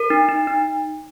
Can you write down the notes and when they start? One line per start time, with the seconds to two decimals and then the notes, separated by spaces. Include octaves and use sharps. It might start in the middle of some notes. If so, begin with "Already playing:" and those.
Already playing: A#4
0.10 D#4
0.28 D#4
0.47 D#4